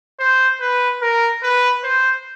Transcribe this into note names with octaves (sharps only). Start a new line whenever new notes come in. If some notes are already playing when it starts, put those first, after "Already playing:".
C5
B4
A#4
B4
C5